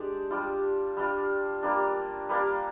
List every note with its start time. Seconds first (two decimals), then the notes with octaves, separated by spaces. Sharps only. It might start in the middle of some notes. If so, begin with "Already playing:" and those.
Already playing: G#3 D4 G4 D5
0.31 G3 D4 F4
0.97 G3 D4 F4
1.63 G3 A#3 D4
2.29 G3 A#3 D4